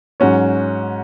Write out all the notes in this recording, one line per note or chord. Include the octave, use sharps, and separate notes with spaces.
G#2 F#3 C#4 F#4 C#5